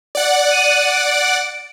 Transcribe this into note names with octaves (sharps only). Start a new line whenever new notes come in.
D5 F#5
D#7
D7